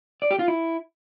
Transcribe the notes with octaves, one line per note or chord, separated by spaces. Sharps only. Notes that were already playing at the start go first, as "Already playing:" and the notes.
D5
G4
F4
E4